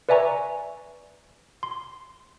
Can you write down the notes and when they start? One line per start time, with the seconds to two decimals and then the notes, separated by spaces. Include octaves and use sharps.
0.09 B4 D5 E5 G#5 A#5 C#6
1.63 C6